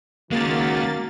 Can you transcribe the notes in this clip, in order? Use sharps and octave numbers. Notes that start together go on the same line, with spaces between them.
D#3 G#3 A#3 C#4 F#4 A6